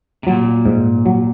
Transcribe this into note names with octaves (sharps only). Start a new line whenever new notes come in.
C3
A#2 F#3
G#2
F#3